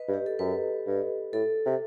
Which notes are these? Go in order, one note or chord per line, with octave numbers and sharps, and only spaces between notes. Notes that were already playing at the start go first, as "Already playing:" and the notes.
Already playing: B4 D#5
G2
G4
A4
F#2 B4
G2
A2 A4
C3